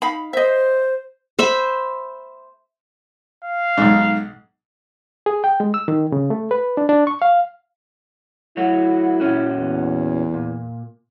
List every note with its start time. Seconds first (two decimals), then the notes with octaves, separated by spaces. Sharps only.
0.02 D#4 F5 B5
0.33 C5 D#5 E5
1.39 C5 E5 B5
3.44 F5
3.78 B1 G#2
5.26 G#4
5.44 G5
5.60 G#3
5.74 E6
5.88 D#3
6.12 C#3
6.30 A3
6.51 B4
6.77 D4
6.89 D4
7.07 C#6
7.22 F5
8.57 F#3 A3 E4 F#4
9.20 A#2 C#4 F#4
9.57 E2
10.34 A#2